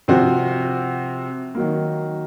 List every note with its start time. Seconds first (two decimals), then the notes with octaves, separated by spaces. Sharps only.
0.08 C3 F3 C4 F#4
1.55 D#3 F#3 A#3